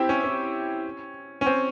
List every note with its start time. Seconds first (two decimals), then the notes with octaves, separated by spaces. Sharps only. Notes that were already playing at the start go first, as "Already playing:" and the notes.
Already playing: C4 E4 G4
0.09 C#4
0.24 C#4
1.41 C#4
1.46 C4